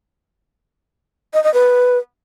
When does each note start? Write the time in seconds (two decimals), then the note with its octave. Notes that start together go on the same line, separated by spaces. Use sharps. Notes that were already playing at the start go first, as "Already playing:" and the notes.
1.34 D#5
1.44 D#5
1.54 B4